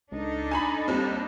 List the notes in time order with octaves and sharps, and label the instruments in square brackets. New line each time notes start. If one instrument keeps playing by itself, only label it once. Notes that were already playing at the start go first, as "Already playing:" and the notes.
[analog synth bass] C#2 [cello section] D4 D#4 A4
[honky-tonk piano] G#5 A#5 B5
[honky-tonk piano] D#2 G3 [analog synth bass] C4